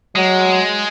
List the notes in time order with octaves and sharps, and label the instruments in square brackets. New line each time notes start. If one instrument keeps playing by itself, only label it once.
[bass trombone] F#3 [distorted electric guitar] G#3